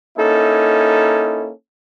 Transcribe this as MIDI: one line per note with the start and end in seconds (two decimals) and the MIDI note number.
0.17 1.51 58
0.17 1.51 61
0.17 1.51 63
0.17 1.51 64
0.17 1.51 69